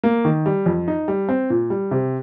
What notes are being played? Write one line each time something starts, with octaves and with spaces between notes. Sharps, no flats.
A#3
D#3
G3
F2
D#4
G3
C4
A#2
G3
C3